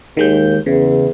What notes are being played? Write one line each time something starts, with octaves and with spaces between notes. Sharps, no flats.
D#2 D#3 G#3 G6
E2 C#3